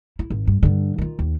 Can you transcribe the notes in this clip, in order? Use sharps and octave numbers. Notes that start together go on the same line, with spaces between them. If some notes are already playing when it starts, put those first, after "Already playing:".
E4
G#1
G2
G2 D3
D#3 F4
D#2